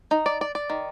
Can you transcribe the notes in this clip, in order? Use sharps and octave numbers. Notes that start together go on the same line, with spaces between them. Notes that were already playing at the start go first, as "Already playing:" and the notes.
D#4
D5
D5
D5
D#3